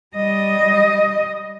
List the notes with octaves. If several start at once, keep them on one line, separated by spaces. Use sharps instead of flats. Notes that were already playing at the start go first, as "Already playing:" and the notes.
G3 D#5